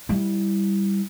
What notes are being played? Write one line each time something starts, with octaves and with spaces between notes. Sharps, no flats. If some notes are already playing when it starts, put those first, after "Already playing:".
G3 E4